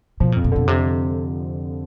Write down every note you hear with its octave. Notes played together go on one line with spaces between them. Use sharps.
B2 F3
A#2
F2
A#2
B2 D3
F2 C3